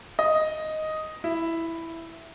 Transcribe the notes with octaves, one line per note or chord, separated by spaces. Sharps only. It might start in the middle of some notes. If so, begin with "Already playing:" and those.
D#5
E4